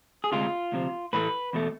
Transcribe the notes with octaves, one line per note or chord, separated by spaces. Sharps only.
G#4
D2 C3 G#3 F4
D2 C3 F3
A2 E3 A3 B4
E2 B2 A3